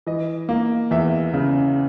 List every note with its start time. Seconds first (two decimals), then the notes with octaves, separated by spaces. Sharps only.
0.07 E3 D#5
0.49 A#3
0.91 E2 E5
1.34 C#3